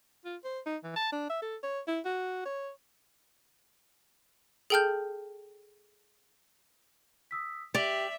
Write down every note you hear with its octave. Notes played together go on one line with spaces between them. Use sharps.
F4
C5
D#4
E3
A5
D4
E5
A4
C#5
E4
F#4
C#5
G#4 A4 G5 A5 F6 G6
D#6 E6 B6
G4 D5 E5 F7 F#7